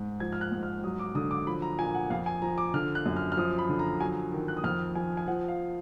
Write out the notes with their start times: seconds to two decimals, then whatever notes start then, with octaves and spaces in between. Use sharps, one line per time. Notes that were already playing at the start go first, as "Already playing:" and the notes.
Already playing: G#2
0.20 F3 G#6
0.32 F6
0.41 F#6
0.52 G#2
0.63 F6
0.84 F#3 D#6
0.99 D6
1.15 D3 D#6
1.31 D6
1.47 F3 B5
1.62 A#5
1.79 A#2 G#5
1.95 F#5
2.10 F2 F5
2.26 G#5
2.42 F3 A#5
2.58 D6
2.74 D3 F6
2.95 F#6
3.06 F#2
3.17 F6
3.32 F6
3.37 F3 D#6
3.58 B5
3.69 D3
3.79 A#5
4.00 F#3 G#5
4.32 D#3
4.48 F#6
4.57 D#6
4.64 F2 F6
4.95 F3 G#5
5.17 G#5
5.27 F3 F#5
5.48 F5